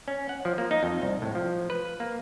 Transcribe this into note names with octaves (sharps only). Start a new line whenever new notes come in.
C#4
F#5
F3
A#3
D#4
F2
C2
A2
F3
B4
A#3